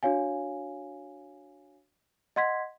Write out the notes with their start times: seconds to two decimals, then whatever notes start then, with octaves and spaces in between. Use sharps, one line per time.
0.03 D4 F#4 C#5 F5 G#5
2.36 D#5 F#5 C6 G#6 B6